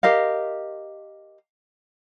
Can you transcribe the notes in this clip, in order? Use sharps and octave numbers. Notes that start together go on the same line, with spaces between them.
G4 A#4 D#5 F5